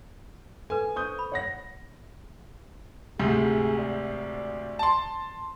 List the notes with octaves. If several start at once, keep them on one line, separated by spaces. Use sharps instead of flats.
A4 B4 G#5
C5 C#6 D#6 G6
B5
C#5 F#5 A#6
D2 G#2 C3 G#4
D5
A5 C6